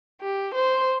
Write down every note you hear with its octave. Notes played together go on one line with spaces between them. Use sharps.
G4
C5